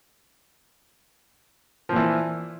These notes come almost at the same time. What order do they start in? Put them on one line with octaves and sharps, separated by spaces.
F3 A#2 E3